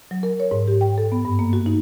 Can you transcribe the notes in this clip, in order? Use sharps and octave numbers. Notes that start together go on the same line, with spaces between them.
F#3
A#4
C#5
G#2
G4
G5
A4
B3
G2
A#3
F#4
D#4